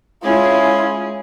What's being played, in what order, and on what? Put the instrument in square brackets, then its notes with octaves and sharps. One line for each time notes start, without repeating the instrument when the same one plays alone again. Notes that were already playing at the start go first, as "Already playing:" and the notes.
[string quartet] G#3 C#4 G#4 [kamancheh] E4 F4